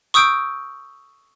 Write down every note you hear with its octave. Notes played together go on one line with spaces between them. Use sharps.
C#6 D#6 E6 G6 D7